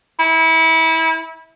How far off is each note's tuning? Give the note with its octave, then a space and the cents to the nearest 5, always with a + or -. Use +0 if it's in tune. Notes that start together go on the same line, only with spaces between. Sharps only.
E4 -25